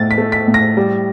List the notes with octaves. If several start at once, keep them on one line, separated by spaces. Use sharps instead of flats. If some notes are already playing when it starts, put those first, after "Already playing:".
Already playing: A2 A3 A6
B6
A3
B6
A2
A#6
G3